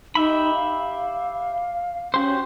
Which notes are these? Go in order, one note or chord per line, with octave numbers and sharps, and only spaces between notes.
D#4 G4 E5 B5
F5
C#4 F#4 G4 C5